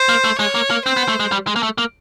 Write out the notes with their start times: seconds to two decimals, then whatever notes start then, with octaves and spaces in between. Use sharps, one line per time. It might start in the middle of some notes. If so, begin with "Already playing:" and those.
Already playing: C5
0.09 A#3
0.24 A3
0.39 G#3 C#5
0.55 A#3
0.70 A#3
0.86 C4 C5
0.97 B3
1.08 A3
1.20 G#3
1.32 G3
1.47 G#3
1.56 A#3
1.63 A3
1.78 A#3